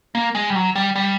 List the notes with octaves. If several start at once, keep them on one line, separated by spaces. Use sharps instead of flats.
A#3
G#3
G3
F#3
G3
G3